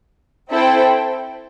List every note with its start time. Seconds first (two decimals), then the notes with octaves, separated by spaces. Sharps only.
0.51 C4 E4 A4 C5 G5